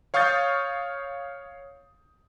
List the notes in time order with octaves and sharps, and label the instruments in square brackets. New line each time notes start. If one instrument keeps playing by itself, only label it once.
[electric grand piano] C#5 F5 C#6 D#6 G6 A6